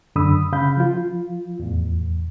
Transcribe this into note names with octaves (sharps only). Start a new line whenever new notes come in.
F#2 D3 B5 D#6 E6
C#3 F5 B5 G6
F3 F4
E2 A2